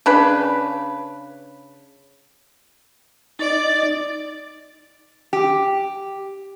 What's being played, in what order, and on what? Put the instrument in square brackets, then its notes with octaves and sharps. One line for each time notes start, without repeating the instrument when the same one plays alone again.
[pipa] C#3 D4 B4
[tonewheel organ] D#4 A6 [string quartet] D5
[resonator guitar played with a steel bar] G4